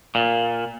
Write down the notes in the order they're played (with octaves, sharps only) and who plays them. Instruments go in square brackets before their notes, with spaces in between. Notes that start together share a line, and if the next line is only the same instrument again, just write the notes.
[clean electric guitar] A#2